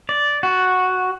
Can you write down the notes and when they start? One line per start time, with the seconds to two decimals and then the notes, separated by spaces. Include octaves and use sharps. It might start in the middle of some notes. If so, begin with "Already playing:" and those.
0.09 D5
0.43 F#4